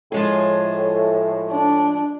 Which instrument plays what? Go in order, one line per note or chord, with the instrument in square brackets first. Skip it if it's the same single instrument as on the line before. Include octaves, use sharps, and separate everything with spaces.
[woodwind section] A2 [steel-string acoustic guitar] F3 G#3 G#4
[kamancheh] D4